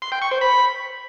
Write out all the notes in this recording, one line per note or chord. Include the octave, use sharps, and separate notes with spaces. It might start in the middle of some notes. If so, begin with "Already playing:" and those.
C6
G5
C#6
C5
B5